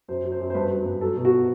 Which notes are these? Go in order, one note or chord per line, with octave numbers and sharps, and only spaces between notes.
F#2 C5
F#3
C5
F#2
C5
G2 B4
F#3
G2
F#3 A4
B2
F#4